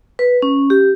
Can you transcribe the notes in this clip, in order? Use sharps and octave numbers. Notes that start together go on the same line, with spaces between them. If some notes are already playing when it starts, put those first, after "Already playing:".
B4
C#4
G4